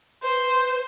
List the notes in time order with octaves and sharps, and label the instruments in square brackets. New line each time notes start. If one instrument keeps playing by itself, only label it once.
[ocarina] B4 [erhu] C5